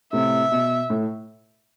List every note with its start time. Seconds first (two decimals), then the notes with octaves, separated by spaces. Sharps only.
0.13 A2 C3 E5
0.52 B2
0.90 A2